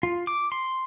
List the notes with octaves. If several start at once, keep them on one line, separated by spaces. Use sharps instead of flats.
F4
D6
C6